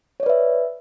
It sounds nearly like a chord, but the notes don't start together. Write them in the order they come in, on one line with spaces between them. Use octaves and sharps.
C#5 D5 B4 E5